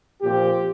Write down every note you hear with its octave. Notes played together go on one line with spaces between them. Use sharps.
A#2 F3 C4 G4